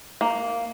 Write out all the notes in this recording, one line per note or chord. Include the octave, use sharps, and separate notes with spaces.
A#3